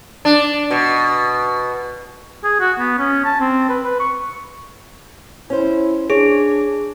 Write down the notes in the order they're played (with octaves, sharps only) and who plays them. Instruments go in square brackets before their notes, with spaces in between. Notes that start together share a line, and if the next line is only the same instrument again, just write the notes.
[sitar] D4
B2
[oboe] G#4
F#4
B3
C#4
A5
C4
B4
B4
C#6
[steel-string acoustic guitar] C#4 C5 [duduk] E4
[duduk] D4 [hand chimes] G#4 [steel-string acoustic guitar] C#5